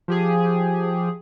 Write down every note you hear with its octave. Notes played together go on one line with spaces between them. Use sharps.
F3 G4 G#4